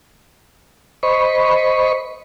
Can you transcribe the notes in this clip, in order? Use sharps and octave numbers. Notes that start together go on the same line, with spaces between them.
C5 D#5 B5 C#6